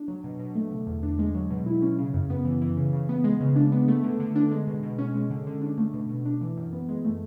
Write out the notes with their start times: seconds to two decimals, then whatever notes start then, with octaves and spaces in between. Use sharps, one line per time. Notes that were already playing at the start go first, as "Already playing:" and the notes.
Already playing: D4
0.08 F#3
0.24 B2
0.40 B2
0.56 A3
0.71 D3
0.87 E2
1.03 D4
1.19 G#3
1.35 F#3
1.50 B2
1.66 E4
1.82 C#4
1.98 C#3
2.14 F#2
2.30 B3
2.45 E3
2.61 E3
2.77 C#3
2.93 C#3
3.09 B3
3.24 G#3
3.40 C#3
3.56 D4
3.72 B3
3.88 A3
4.04 D3
4.20 D3
4.36 D4
4.51 G#3
4.67 B2
4.83 B2
4.99 C#4
5.14 G#3
5.30 D3
5.47 D3
5.62 D4
5.78 A3
5.94 B2
6.09 B2
6.26 D4
6.41 E3
6.57 F#2
6.73 B3
6.89 G#3
7.05 A3